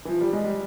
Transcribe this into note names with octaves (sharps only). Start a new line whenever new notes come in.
E3
F3
G3
G#3
G3